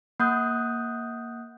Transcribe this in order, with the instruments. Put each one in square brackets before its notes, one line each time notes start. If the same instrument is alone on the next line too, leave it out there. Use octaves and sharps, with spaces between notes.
[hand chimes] A#3 F#5 D#6 F#6 G6